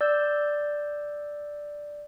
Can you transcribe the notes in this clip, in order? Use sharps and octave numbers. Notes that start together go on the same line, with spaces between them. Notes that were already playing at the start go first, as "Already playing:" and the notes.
D5 E6 G6